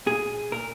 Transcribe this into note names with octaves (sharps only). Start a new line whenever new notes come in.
A#2 G#4
A#2 A#4